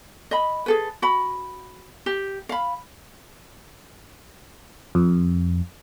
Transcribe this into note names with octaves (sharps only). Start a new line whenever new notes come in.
D#5 B5
G#4 A4 B4
F#4 B5
G4
F5 B5
F2